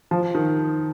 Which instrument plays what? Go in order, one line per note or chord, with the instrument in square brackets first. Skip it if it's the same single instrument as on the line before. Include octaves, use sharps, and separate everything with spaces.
[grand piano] F3
D#3